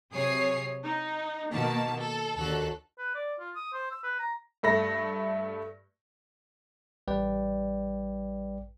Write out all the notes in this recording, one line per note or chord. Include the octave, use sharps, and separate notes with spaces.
C3 F#3 G#4 C#5 D#6 C7
D#4
B2 D#3 A#3 F#4 A5
A4
D#2 D3 F#4 A4 F#6
B4
D5
F4
D#6
C5
E6
B4
A#5
G2 A3 B5 A#6
A1 G3 B4 D5 G5